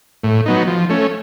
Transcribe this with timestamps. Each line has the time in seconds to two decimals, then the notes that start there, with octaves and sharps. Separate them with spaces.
0.24 A2
0.46 F#3 B3 D#4
0.68 F3
0.89 A3 C#4